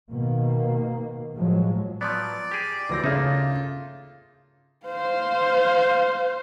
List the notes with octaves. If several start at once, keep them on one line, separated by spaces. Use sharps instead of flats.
B2 D#3 A#3
A2 F3 F#3 G#3
F3 F#3 B3 D5
G4 G#4
A1 D2 E3 C4 A#6
C#3 A#3 D#4 F4 A4 E5 D#6
C5 F5